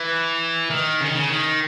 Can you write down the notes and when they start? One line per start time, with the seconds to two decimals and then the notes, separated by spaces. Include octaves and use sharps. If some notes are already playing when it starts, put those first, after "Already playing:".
Already playing: E3
0.70 D#3
1.00 C#3
1.08 D#3
1.15 C#3
1.29 D#3